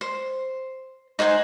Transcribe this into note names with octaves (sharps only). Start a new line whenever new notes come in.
C5
D#4 C5 F#5 G#5